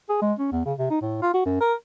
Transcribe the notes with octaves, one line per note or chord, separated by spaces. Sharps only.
G#4
G#3
C#4
E2
C#3
C3
D#4
A2
F4
F#4
F#2
A#4